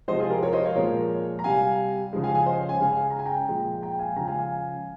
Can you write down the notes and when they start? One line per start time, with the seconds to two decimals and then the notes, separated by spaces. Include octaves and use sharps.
0.08 C3 F3 G#3 C5 D#5
0.19 F4 G#4
0.31 G4 A#4
0.43 A#4 C#5
0.53 C5 D#5
0.65 C#5 F5
0.76 A#2 F3 G#3 A#4 C#5
1.39 A#5
1.44 C3 G3 F5 G#5
2.13 C#3 F3 G#3
2.24 F5 G#5
2.35 F5 G#5
2.46 C5 D#5
2.57 C#5 F5
2.69 F5 G#5
2.80 C#3 G#3 F5 G#5
2.92 F5 G#5
3.10 A#5
3.19 G#5
3.26 G5 A#5
3.48 A#2 F3 G#3
3.82 G5 A#5
3.99 F5 G#5
4.16 C#3 F3 G#3 G5 A#5
4.28 F5 G#5
4.38 F5 G#5